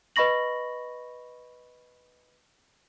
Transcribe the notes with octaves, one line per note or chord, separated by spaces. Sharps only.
B4 D#5 B5 C#6 A#6 F#7